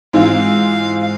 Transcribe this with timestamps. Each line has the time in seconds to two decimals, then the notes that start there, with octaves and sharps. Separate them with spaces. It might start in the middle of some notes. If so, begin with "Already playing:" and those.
0.13 G#2 E3 G#3 C4 F4 F5
1.02 F5